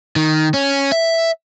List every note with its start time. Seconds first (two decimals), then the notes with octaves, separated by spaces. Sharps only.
0.16 D#3
0.54 C#4
0.92 E5